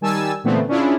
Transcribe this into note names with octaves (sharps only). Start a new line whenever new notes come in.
D#3 G3 G#5 A5 E6
A#2 D3 E3 A3 B3 C4
C#4 D4 E4 F4 G#4